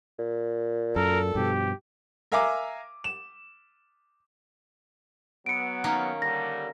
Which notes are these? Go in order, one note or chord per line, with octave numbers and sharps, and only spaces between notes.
A#2
F#2 A4 A#4
G2 B2 F3 G4
A#4 E5 F5 G#5 A#5 D6
E7
F#3 B3 C#7 D7
D#3 A#3 C#4
D3 G3 A#6